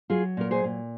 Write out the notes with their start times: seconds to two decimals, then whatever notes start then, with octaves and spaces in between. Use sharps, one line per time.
0.10 F#3 F4 G#4
0.37 A#2 A#4
0.51 G#4 C5
0.64 A#2